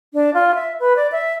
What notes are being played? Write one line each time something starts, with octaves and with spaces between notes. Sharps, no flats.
D4
F4
E5
B4
D5
E5